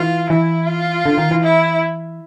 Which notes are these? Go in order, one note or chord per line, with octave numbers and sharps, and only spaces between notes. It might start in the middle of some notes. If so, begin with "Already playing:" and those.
Already playing: E3 F4
E3 E4
F4
D3
D#3
E3
E4